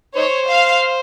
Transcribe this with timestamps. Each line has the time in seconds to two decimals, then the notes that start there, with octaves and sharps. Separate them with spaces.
0.16 D#4 C5 C#5
0.49 F5